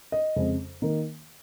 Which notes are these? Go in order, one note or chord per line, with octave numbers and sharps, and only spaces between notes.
D#5
F2 C#3 G#3 C#4
D#3 A#3 D#4